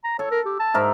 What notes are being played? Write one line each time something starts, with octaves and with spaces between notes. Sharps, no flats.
A#5
A4 C#5
A#4
G4
A5
G#2 A#4 E5